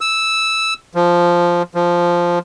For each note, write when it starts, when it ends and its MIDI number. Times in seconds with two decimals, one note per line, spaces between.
0.01 0.74 88
0.95 1.62 53
1.75 2.39 53